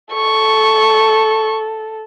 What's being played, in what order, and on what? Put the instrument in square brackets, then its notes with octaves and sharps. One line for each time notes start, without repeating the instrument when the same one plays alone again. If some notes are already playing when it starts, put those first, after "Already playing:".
[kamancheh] A4 [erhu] C#6